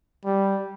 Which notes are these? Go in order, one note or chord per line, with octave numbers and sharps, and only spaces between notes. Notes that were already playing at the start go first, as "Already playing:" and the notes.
G3